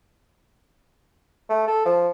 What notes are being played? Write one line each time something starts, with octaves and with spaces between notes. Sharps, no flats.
A3
A4
F3